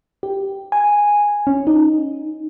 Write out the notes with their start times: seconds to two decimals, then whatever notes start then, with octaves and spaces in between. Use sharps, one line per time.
0.23 G4
0.72 G#5
1.47 C#4
1.67 D#4